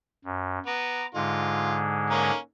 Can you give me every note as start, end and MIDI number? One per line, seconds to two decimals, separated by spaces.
0.25 0.59 42
0.66 1.04 59
0.66 1.06 82
0.66 1.06 86
1.15 2.31 44
1.15 2.31 50
1.15 2.31 56
1.15 1.79 65
2.10 2.37 58
2.10 2.37 61
2.10 2.37 70